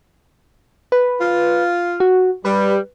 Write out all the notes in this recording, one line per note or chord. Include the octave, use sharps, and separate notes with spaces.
B4
F4
F#4
G3 B4